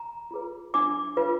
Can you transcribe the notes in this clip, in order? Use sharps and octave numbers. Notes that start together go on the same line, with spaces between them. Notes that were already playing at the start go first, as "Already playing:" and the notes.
Already playing: A#5
F4 G#4 B4
D4 D6
F4 B4